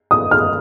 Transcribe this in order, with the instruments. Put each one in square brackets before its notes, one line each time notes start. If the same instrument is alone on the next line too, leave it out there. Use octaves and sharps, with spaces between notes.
[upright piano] D#6
F6